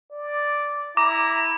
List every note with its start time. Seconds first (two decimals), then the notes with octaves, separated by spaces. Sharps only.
0.12 D5
0.97 E4 A#5 D6